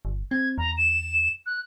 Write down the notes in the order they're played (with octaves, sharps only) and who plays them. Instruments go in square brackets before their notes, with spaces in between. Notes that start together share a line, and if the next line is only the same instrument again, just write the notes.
[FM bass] G1
[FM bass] C4 [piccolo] G#6
[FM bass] E2 [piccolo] A#5
[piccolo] E7
F#6